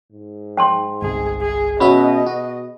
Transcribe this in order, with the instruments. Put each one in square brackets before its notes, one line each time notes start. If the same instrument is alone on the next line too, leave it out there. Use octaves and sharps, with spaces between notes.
[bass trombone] G#2
[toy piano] G5 A5 C6
[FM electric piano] G1 C2 [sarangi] G#4
[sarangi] G#4
[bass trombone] B2 [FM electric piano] C#4 F#4 E5 [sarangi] D#5 [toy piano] B5
[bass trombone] B2 [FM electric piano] F#4